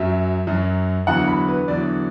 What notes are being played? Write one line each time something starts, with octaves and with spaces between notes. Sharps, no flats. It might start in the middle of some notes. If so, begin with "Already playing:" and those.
Already playing: F#2 F#3 E5
F#2 F#3
E2 D3 F#3 F#5
B5
B4
E2 D3 F#3 D5